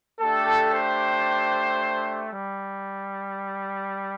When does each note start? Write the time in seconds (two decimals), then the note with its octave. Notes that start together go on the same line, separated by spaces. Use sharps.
0.20 A3 D4 G4 A4
0.73 C5
2.31 G3